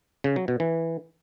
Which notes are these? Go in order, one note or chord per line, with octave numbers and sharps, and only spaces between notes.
C#3
F#3
B2
E3